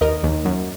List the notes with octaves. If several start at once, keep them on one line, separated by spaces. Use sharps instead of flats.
D#2 A#4 D#5
D#2
F#2